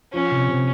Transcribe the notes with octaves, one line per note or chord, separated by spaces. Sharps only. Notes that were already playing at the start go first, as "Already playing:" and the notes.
F3 C#4
C3
C3